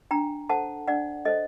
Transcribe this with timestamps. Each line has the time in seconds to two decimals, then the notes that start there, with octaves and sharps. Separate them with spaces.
0.11 D4 G5 A#5
0.49 A4 C5 F#5 A5
0.88 D4 D5 F#5
1.25 A4 C5 D#5